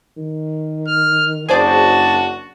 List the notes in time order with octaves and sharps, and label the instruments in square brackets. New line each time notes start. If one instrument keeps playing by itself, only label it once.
[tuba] D#3
[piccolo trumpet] F6
[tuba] F#1 [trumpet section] D4 A5 [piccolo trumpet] F#4 [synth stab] G#4 C5 D5